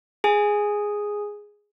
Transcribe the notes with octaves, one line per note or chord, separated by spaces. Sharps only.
G#4 G#5